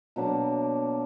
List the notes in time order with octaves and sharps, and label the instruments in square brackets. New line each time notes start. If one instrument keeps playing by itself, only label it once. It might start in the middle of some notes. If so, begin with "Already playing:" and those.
[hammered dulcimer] B2 F#3 A#3 D4